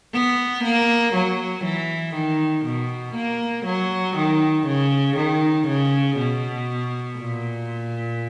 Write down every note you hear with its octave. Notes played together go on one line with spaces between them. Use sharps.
B3
A#3
F#3
E3
D#3
B2
A#3
F#3
D#3
C#3
D#3
C#3
B2
A#2